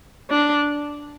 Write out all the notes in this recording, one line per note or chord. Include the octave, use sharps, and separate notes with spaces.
D4